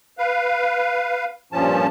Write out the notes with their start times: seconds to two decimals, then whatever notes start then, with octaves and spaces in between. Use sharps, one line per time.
0.18 B4 F5
1.53 G2 A#2 F3 C#4 A5